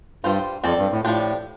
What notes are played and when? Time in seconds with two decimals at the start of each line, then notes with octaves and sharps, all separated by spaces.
0.24 G2 G3 F4 C5
0.64 F2 C4 A4 D5
0.78 G2
0.91 A2
1.05 A2 F3 D4 G4